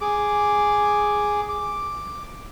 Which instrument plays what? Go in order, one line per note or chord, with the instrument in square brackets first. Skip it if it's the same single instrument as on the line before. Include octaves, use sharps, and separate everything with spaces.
[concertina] G#4 D6
D6